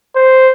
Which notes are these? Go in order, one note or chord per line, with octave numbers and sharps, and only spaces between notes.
C5